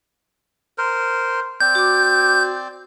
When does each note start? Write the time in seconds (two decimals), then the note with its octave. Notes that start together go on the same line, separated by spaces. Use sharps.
0.78 A#4 C5
1.60 C4 D5 G6
1.75 F#4 D6